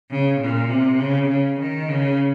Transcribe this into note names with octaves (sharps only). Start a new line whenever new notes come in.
C#3
A#2
C3
C#3
C#3
D#3
C#3